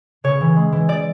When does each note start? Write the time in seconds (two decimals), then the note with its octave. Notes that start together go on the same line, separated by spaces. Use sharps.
0.24 C#3 C#5
0.41 E3
0.56 G#3
0.72 E3
0.89 D5